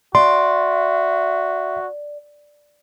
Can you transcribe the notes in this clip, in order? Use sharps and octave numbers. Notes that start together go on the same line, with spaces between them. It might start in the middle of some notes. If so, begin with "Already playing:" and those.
F#4 D5 E5 C6